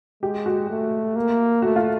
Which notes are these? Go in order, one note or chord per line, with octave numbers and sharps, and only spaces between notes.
G#3 G4
F#4
A3
A#3
A3 F#4
F4